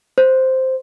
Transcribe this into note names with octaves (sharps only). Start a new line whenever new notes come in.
C5